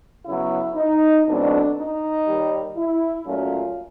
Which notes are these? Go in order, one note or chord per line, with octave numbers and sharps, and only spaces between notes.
C#3 F#3 B3 E4
D#4
E2 B2 F#3 A3 C4 D4
D#4
D#2 D#3 G3
E4
A#2 F#3 A3 C#4 F4